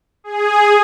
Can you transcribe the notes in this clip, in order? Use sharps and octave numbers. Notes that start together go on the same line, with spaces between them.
G#4